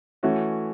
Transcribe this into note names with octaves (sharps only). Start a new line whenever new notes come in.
E3 A3 C#4 F#4